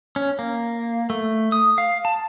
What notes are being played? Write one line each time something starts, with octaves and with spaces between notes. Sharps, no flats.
C#4
A#3
A3
D#6
F5
A5